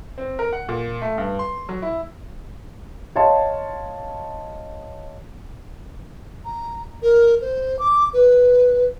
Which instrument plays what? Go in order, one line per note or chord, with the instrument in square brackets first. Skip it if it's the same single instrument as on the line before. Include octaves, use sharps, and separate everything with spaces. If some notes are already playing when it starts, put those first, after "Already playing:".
[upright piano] C4
A#4
F#5
A#2
A3
G2
C6
F#3
E4
C#5 D#5 F5 A5 C6
[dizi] A#5
A#4
C5
D6
B4